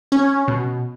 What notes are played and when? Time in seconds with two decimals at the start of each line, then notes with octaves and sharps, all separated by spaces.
0.12 C#4
0.48 B2